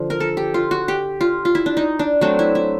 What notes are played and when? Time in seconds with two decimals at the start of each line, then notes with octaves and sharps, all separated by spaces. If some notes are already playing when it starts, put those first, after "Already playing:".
Already playing: D3 F3
0.10 A#4
0.20 A4
0.37 G4
0.54 F4
0.71 F#4
0.88 G4
1.21 F4
1.45 F4
1.55 E4
1.66 D4
1.77 D#4
1.99 D4
2.21 F#3 A3 C4 D4
2.39 E4
2.55 E4